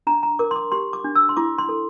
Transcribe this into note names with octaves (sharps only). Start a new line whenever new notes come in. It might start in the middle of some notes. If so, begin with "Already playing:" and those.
D4 A#5
A#5
A#4 D6
C6
D6
G4 C6
D6
D4
E6
C6
E4 D6
C6
A4